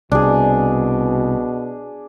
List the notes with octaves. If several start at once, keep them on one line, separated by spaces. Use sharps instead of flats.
C2 B2 D4 G#4